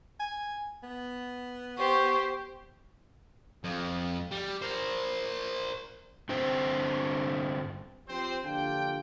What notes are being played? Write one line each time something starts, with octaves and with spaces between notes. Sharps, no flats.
G#5
B3
G4 C5 C#6
F2
G3
A#4 C5
G2 D3 C4 C5
F3 G3 C4 C5
A#1 D3 D4 F4 G4 G5